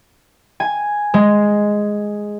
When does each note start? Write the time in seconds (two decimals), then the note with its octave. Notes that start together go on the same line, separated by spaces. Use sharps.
0.60 G#5
1.14 G#3